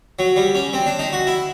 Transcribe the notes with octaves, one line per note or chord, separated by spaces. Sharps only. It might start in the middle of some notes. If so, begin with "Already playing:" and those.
F#3
G3
C#4
C4
D4
D#4
F#4
E4